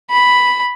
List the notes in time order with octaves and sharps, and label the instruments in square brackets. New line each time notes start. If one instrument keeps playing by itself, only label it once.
[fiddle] B5